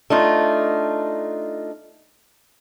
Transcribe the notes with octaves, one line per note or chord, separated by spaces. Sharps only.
A3 D4 D#4 F4